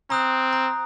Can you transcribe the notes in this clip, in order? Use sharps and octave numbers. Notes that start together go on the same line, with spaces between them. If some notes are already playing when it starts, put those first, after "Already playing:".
C4 A#5 D#6 F#6
A#5